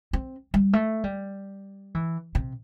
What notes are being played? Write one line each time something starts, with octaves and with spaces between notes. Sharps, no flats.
C4
G3
A3
G3
E3
C3